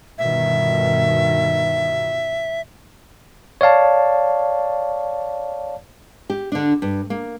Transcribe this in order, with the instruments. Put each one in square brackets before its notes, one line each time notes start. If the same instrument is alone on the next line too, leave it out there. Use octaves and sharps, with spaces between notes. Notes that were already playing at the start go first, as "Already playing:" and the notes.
[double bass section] G1 B2 D#3 [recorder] E5
[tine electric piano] C#5 D5 F5 A5
[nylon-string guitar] G4
D3 D4
G2
A#3